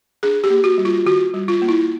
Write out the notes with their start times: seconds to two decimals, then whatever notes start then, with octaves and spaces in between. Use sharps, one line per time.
0.23 D4 G#4
0.44 G4
0.50 A#3
0.64 F#4
0.78 G3
0.85 F4
1.06 D#3 F#4
1.34 G3
1.48 F4
1.62 A#3
1.68 E4